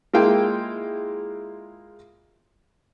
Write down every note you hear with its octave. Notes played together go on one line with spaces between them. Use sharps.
G#3 A#3 E4 F4 F5 G5